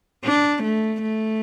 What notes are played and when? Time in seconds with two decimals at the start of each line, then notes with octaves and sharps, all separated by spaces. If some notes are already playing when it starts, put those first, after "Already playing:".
0.25 D4
0.63 A3
1.02 A3